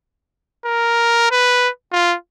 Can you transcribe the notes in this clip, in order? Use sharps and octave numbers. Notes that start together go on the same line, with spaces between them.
A#4
B4
F4